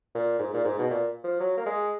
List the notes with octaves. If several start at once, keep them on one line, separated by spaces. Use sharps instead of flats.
A#2
G#2
A#2
G#2
B2
A#2
F3
F#3
A#3
G#3